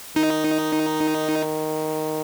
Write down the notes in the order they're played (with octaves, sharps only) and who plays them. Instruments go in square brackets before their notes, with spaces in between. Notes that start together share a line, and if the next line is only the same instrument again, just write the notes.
[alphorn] D#3 [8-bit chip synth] D#4